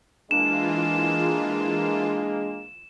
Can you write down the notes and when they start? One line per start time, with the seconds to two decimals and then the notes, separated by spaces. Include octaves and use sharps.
0.31 E3 G#3 A#3 D4 F4 E7